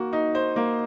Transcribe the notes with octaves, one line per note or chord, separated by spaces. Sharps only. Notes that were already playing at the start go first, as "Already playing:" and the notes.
Already playing: A#3 F#4
D#4
C5
A#3